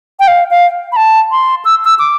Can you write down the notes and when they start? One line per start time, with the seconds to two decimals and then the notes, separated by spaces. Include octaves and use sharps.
0.20 G5
0.28 F5
0.51 F5
0.92 B5
0.96 A5
1.31 C6
1.65 E6
1.85 E6
1.99 D6